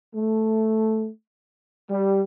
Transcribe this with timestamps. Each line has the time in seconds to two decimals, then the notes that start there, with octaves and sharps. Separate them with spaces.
0.14 A3
1.90 G3